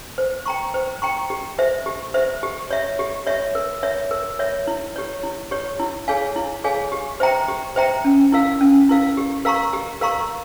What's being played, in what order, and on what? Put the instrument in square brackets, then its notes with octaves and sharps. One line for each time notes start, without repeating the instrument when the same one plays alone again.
[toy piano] C5
G5 A#5 C#6
C5
G5 A#5 C#6
G4
C5 E5
G4
C5 E5
G4
C#5 E5
G4
C#5 E5
A#4
C#5 E5
A#4
C#5 E5
E4
G4 C#5
E4
G4 C#5
E4
G#4 C#5 F5 G#5
E4
G#4 C#5 F5 G#5
G4
C5 E5 G5 A#5
G4
C5 E5 G5 A#5
C#4
E4 A#4 F5
C#4
E4 A#4 F5
G4
A#4 F5 A#5 C#6
G4
A#4 F5 A#5 C#6